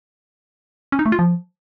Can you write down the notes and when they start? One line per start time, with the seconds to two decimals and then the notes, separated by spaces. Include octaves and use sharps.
0.92 C#4
0.99 D#4
1.06 A3
1.12 F4
1.19 F3